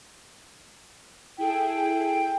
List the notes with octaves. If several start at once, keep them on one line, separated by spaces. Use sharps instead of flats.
E4 G#4 A4 G5